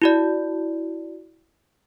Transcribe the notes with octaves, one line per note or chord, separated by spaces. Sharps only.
E4 F#4 D5